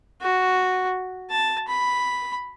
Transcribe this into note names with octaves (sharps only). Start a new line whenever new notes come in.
F#4
A5
B5